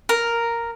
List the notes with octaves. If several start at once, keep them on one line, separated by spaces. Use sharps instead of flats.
A#4